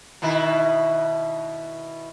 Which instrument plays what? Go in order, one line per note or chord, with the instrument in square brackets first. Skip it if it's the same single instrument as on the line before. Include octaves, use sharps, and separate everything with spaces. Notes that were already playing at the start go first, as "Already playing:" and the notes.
[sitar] B2 D#3 E4